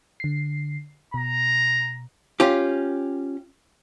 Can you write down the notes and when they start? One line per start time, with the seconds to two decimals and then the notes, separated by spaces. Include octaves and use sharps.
0.20 D3 C7
1.14 B2 A#5
2.40 C#4 F4 G4